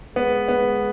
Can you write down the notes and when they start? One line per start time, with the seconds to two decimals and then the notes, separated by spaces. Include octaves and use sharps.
0.16 G#3 B3
0.48 B3